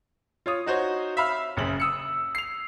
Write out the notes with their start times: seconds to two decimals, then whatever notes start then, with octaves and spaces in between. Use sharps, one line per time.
0.46 F4 C#5 D#6
0.66 D#4 F#4 C5 C#5
1.17 E5 F5 B5 F6
1.57 F#1 C#3 F#7
1.80 D#6 E6 C#7
2.35 C7 F7